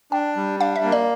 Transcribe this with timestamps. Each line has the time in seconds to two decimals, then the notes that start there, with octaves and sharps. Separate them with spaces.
0.12 D4 G5
0.36 G3
0.60 D4 F5
0.76 E5
0.84 A#3
0.92 D5